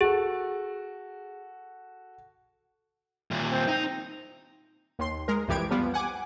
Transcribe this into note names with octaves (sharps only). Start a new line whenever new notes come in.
F#4 G#4 A4
D#2 A#2
C4
D#4
D#2 C6
G#3 A#4
C2 F2 E3 G4 G#6 D7
F3 G3 B3 F4
F#5 G#5 D6